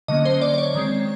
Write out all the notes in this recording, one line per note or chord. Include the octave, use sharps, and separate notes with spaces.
D3 F#3 A#3 C#4 D#5
C5
D5
D5
C#5
D#3 G#3 C4